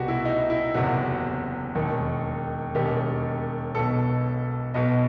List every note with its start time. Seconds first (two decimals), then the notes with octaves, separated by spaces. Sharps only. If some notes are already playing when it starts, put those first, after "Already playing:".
Already playing: C2 B2 F#4 G4
0.08 E4
0.25 D#4
0.50 E4
0.74 F#1 E2 C3 F#4
1.75 E1 D#2 D#3
2.75 E1 D#2 D#3 G4
3.75 B1 B2 A4
4.74 B1 B2 D#5